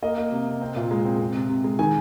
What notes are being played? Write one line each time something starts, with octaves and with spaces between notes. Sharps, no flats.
A#3 D#5
A#3
C3
C3
C4
A#2
G#3
C4
C4
C3
C3
G#3
D#3 G#5